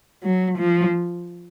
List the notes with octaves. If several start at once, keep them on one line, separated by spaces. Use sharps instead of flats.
F#3
F3